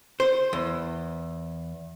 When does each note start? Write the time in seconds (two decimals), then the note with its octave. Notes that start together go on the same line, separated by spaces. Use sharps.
0.20 C5
0.53 E2